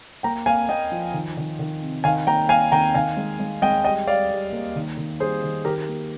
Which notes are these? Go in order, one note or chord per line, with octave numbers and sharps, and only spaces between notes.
A#3 G5 A#5
A#3 F5 G#5
A#3 D#5 G5
F3
D#3
D#3
D#3
C3
D#3 F5 G#5
A#3 G5 A#5
A#3 F5 G#5
D#3 G5 A#5
D#3 F5 G#5
G#3
G#3
G#3 D#5 G5
G3 D#5 G5
G3 D5 F5
G3
A#3
D#3
D#3
G3 G#4 C5
D#3
D#3 G4 A#4
A#3